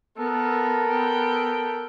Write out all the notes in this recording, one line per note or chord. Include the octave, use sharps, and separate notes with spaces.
B3 A4 A#4
B3 G5